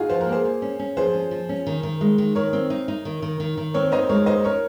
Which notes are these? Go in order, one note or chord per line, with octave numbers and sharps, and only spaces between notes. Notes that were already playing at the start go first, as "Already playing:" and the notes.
Already playing: D#4 F4 F#4 G#4
F3 C5
A#4
A#3
G#4 C5
A#3
C#4
C#4
F3 G#4 C5
C#4
F3
C#4
D#3
D#3
G#3
D#3
D#3 A#4 C#5
C4
D#4
D#4
D#3
D#3
D#3
D#3
C4 A#4 C#5
D#4 C5 D#5
G#3 A#4 C#5
D#4 C5 D#5
C#4 A#4 C#5